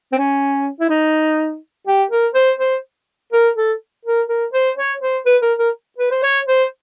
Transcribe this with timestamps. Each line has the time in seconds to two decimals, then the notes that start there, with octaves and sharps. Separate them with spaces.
0.12 C4
0.18 C#4
0.80 E4
0.90 D#4
1.87 G4
2.10 A#4
2.34 C5
2.59 C5
3.32 A#4
3.56 A4
4.05 A#4
4.29 A#4
4.53 C5
4.77 C#5
5.01 C5
5.26 B4
5.42 A#4
5.58 A#4
5.98 B4
6.11 C5
6.23 C#5
6.47 C5